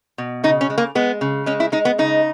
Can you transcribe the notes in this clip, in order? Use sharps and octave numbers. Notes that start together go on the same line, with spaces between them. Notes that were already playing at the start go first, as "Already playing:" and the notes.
B2
C#3 D#4
C#4
G#3
A#3
G#3 B3
C#3
G#3 C#4
E4
G#3 D#4
B3
C#3 D#4